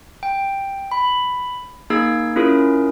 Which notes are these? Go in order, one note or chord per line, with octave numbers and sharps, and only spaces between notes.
G5
B5
A#3 D#4 G#4 E6 G#6 C7
C#4 E4 F4 G#4 A#4